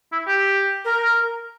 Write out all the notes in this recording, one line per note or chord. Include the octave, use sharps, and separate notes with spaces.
E4
G4
A#4